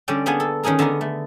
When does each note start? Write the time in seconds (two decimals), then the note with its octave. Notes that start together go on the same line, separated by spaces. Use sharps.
0.08 D3 G3 C#4 D5 G5
0.26 G3 A#3 B3 D4 G#4 G#5
0.40 A4
0.63 D#3 C#4 D#4 G#4 A#4
0.79 D3 B3 D#4 A#4
1.01 A3